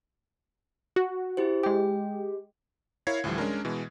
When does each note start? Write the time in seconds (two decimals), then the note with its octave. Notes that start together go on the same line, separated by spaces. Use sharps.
0.96 F#4
1.37 E4 G4 C5
1.63 G#3 G4 G5
3.07 E4 A#4 C#5 F5 G#6 C7
3.24 D2 A2 E3 F3 G3
3.38 G#3 C#4 D4 A#4
3.65 B2 E3 G#3